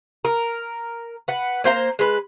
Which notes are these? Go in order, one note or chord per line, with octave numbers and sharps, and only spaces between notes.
A#4
B4 F#5
A#3 C5 F5 A#5
G#3 B4